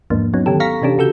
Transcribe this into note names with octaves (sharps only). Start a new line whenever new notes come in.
E2 G#2 F3 A#3 D4
F#3 B3 C#4 D#4
D3 D#3 C#4 G4 A4
F5 A#5 C#6 A#6 B6
C3 E3 C#4 D4 G4 A4
C#3 F#4 A4 E6 G6